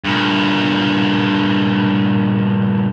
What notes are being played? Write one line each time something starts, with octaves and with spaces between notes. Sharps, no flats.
G2 A#2